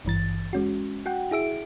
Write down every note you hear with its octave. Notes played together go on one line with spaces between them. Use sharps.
G#1 G2 E3 A6
G#3 C#4 F#4
F#4 F#5 G5
E4 G#4 E5 D7